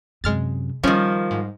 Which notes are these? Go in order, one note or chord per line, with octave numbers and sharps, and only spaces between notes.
F#2 C3 G#3 F6 A6
D#3 F3 G3 C#4
G#2